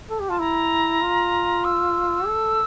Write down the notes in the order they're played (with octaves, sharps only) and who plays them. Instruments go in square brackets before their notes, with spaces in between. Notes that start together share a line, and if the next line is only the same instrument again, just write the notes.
[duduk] A4
G4
[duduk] F4 [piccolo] A5
[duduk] E4 [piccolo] A#5
[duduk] F4
[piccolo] E6
[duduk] A4